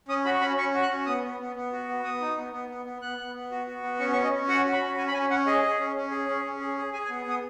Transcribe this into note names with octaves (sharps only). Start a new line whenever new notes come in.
C#4 D#6
F#4 B5
C#4 B5
C#4 C#6
F#4
F#6
C#4
B3 D#6
B3
B3
B3
F#4
B3
B3 D#6
D#4
B3
B3
B3
B3
B3 F#6
B3
B3
F#4
F#4
B3
C#4 C#6
C#6
C#4
D#5
C#4
F#4 F#5
F#4
B5
C#4
C#4 G#5
B5
C#4 G#5
C#4 F#5
G#4 D#5
G#4
C#4
C#4
G#4
C#4
C#4
G#4
G#4
G#4 G#5
G#5
B3
B3 D#6